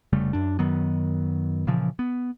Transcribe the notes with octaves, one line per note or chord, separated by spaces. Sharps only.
F1 C#3 G3 A3
F#2 D4
F#2 D#3 F#3 B3
A#2 C#3 E3 F3
B3